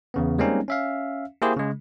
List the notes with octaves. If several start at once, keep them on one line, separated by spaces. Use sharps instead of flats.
E2 C#3 B3
G3 G#3 A#3 C4 C#4 D#4
C#4 E5 F5
A#3 E4 G4 G#4 C5
C#3 G#3